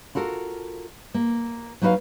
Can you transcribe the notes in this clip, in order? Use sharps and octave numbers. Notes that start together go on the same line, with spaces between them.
F4 F#4 A4 A#4
A#3
F#3 D#4 F#4 B4 F5